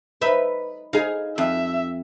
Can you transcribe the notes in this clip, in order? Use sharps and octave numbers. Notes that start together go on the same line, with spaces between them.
D#4 B4 E5
D#4 G#4 F5
F2 E5